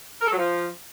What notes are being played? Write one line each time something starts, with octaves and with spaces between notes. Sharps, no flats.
A#4
A4
F#3
F3